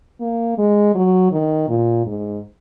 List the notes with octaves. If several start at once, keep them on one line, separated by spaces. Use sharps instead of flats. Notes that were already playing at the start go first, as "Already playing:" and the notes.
A#3
G#3
F#3
D#3
A#2
G#2